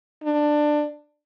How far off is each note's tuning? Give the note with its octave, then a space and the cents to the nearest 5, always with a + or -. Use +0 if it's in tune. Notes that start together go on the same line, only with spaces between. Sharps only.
D4 +15